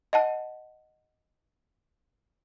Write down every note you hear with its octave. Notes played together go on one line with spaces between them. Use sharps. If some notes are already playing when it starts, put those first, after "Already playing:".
D#5 F#5 A5